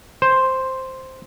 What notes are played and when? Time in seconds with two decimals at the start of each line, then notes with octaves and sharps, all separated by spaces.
0.22 C5